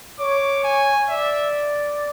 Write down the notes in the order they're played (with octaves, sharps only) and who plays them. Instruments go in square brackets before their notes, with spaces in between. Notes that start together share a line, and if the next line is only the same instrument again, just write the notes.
[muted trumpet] C#5 [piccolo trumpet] D6
[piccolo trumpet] G#5
[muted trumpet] D5 [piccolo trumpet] E5